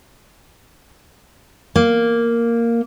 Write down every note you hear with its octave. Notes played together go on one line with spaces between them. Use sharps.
A#3